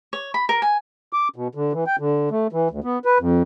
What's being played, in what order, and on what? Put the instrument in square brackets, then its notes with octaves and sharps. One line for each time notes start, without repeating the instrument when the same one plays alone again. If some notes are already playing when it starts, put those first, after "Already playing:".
[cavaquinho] C#5
B5
A#4
G#5
[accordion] D6
B2
D3
E3
G5
D3
A3
E3
D2
B3
B4
F2